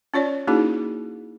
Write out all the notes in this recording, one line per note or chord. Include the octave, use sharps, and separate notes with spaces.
C#4 F4 C#5 D5
A#3 C#4 D#4 E4 F#4 G#4